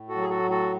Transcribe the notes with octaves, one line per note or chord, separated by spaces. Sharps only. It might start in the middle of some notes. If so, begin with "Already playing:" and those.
Already playing: A2
F#4 A4
F#3
G#4
F#4 A4
A2
F#4 A4